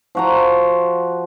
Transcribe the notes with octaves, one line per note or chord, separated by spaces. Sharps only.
F3 F#4 A#5